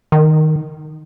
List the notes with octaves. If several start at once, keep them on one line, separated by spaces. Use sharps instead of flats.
D#3